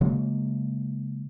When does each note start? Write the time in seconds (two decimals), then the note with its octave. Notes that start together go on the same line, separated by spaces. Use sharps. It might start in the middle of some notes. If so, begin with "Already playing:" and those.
0.01 C#3 F#3 G#3 A#3